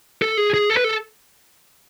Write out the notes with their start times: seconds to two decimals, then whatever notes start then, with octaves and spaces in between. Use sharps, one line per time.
0.22 A4
0.37 G#4
0.54 G#4
0.70 A4
0.77 B4
0.84 A4